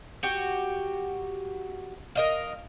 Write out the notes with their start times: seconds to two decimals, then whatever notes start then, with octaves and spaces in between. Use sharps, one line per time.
0.23 F#4 G4
2.15 A#4 D#5 F5